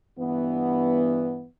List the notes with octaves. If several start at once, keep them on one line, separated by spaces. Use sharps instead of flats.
G2 E3 B3